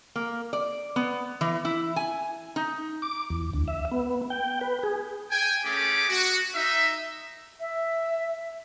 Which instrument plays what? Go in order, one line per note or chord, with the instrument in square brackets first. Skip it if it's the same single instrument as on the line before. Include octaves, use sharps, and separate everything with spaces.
[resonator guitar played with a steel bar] A#3
D5
B3
E3
E4
G#5
D#4
[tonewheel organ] D6
E2
D2
E5
B3
G5
B4
G#4
[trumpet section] G5 G#5
A3 C#4 G4 G#4 D6
F#4
D#4 E5
[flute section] E5